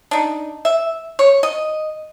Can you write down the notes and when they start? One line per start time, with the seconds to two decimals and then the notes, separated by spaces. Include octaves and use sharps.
0.11 D4 D#4
0.65 E5
1.19 C#5
1.43 D#5